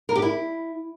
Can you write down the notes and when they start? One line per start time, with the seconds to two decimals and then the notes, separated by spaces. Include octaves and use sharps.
0.09 A#4
0.15 G4
0.22 E4